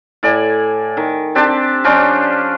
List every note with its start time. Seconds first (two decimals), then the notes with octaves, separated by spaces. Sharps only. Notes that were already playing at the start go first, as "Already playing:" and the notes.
0.23 A2 D5 G#5
0.97 D#3
1.35 C4 D4 G4 A5
1.84 F3 C#4 D4 G5